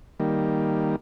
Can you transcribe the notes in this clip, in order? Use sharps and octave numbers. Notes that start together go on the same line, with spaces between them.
D#3 G3 A#3